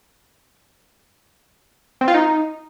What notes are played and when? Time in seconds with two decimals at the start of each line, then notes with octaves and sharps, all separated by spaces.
2.01 C4
2.08 F4
2.14 D#4